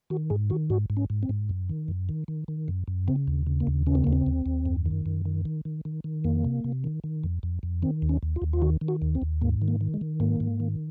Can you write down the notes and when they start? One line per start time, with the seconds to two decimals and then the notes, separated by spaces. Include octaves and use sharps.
0.10 D#3 F#4
0.30 G#2 G#4
0.50 D#3 F#4
0.70 G#2 F#4
0.90 G#2
0.97 C#4
1.10 G#2
1.23 C4
1.29 G#2
1.49 F#2
1.69 D#3
1.88 F#2
2.09 D#3
2.28 D#3
2.48 D#3
2.68 F#2
2.88 F#2
3.08 C#3 C4
3.28 D#2
3.47 C#3
3.60 A#3
3.67 D#2
3.87 C#3 C#4
3.95 C4
4.04 D#2 A#3
4.13 C4
4.26 D#2
4.46 D#2
4.66 F#2
4.86 D#3
5.06 F#2
5.26 D#3
5.45 D#3
5.65 D#3
5.85 D#3
6.04 D#3
6.24 F2 A#3
6.44 C3
6.64 C3
6.84 D#3
7.04 D#3
7.24 F2
7.43 F2
7.63 F2
7.82 D#3 C4
8.02 D#2
8.09 C#4
8.23 D#2
8.36 F4
8.42 D#2
8.53 F4
8.62 D#3 F#4
8.81 D#3
8.88 F#4
9.02 D#2
9.15 C4
9.22 D#2
9.41 G#2 A#3
9.62 D#3
9.68 A#3
9.81 D#3
9.94 G#3
10.01 D#3
10.20 G#2 A#3
10.40 G#2
10.60 D#3